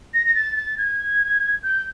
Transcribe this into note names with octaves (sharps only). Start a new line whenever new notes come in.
A#6
A#6
A6
A6
G#6
G6